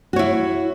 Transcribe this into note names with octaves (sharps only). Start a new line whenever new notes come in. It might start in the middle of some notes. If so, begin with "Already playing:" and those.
E4 F#4 C#5